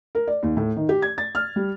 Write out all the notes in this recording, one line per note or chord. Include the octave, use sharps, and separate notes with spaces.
A#4
D5
D#2
A2
D#3
G4
G#6
A6
F6
G3